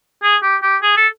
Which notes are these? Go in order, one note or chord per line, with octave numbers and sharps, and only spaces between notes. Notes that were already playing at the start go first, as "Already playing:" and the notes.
G#4
G4
G4
G#4
A4